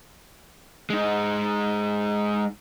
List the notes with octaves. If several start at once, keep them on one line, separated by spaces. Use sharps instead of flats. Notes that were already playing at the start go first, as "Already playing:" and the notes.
G#3 D#4